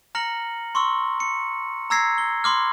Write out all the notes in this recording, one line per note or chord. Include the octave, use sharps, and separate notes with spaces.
A#5 F6 A#6 C#7 F#7 G7
C6 C#6 E6
C#7
A#5 D6 E6 G#6 A#6 C7
G7
B5 C6 D6 F6